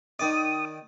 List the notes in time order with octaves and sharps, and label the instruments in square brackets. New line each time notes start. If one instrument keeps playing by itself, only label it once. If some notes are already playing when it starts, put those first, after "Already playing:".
[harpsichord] D#3 D5 [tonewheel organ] D#6